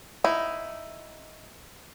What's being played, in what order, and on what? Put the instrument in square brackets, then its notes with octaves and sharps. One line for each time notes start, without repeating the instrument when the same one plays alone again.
[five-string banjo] D#4 E4